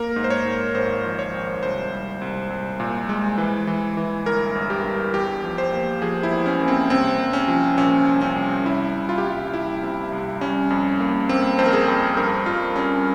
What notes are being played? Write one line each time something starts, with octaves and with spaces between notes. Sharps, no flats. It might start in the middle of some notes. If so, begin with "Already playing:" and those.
Already playing: A#3 A#4
G#2
C5
C#5
G#2
G#1 C5
F3
C#5
G#1
C2 C5
C2
C2
C2
A#2
G#3
E3
E3
E3
G1 A#4
G1
G4
G2
E2 G4
F3
C5
A#3
F3 G#4
E4
E2
C#4
A#3
C4
C2 C4
C2
C#4
F3
A#2 C#4
C2
C#4
C2
C2 E4
C2
F4
G4
C2 F4
C2 E4
C3
C2
G3 C#4
F2
A#3
A#3 C4
F2 C5
A#4
G#4
F2
G2 A#4
G2 F4
G3 C#4